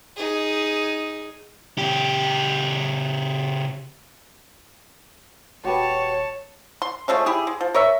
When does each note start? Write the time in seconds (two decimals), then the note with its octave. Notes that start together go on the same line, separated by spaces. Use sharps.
0.17 D#4 G#4
1.78 C#3 G4
5.64 D#1 F#4 G4 B4 C#5 A5
6.82 C6
7.08 F3 G#3 A3 C#4
7.26 E4 G4 G#4
7.47 G#3
7.61 F3
7.74 A#4 C#5 E5